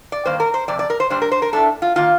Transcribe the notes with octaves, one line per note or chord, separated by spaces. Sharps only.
D5
G2 D#3 A#3 C5
A#4
C5
F2 C3 D5
D5
A#4
C5
A#2 G3 D4 C5
A#4
C5
A#4
A2 A3 D4 A4
F4
D#3 A#3 F4